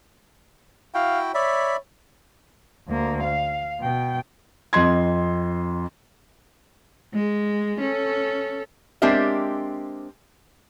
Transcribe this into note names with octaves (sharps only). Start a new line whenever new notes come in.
E4 F#4 F5 G5
C#5 D5 E5 B5
D2 A#3
F5
B2 G5
F2 D#5 C6 G#6
G#3
C#4 A4
G#3 C4 D4 G4 A#4 E5